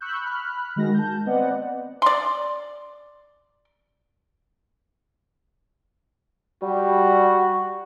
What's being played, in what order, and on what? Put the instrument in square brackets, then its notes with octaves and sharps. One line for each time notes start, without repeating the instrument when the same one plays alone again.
[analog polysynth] B5 C#6 E6 F#6 G6
B5 F6 F#6
D#3 G#3 F#4 A#6
A5 G6
B3 C4 D5 D#5 F#5
[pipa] D5 C6
[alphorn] G3 [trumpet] F#4